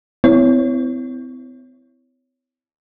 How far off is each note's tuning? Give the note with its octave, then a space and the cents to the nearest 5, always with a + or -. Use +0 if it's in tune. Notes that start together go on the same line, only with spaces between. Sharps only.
C4 -40 E4 +0 C#5 +5